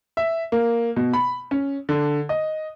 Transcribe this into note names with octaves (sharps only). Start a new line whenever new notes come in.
E5
A#3
B2
B5
C#4
D3
D#5